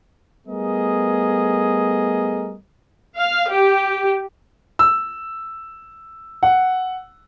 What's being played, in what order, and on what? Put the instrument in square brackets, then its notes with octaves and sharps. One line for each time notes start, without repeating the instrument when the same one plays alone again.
[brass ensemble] G3 A3 B3 G#4 A#4 D#5
[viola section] F5
G4
[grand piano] E6
F#5